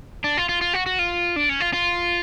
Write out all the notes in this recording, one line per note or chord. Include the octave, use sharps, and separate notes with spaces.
D4
F4
F4
F4
F#4
F#4
F4
D4
C#4
F4
F4